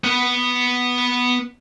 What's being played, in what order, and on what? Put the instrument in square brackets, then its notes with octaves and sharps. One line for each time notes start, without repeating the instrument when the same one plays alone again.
[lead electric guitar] B3 B4